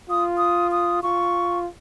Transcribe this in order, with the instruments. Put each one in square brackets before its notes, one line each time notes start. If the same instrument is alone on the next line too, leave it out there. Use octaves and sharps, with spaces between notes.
[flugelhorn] F4 [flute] D#6
[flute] D#6
D#6
[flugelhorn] F4 [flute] C#6